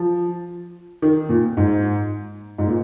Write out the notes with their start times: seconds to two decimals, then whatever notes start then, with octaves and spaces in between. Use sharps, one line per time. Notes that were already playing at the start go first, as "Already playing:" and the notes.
Already playing: F3
1.02 D#3
1.29 A#2
1.57 G#2
2.58 G#2
2.67 A#2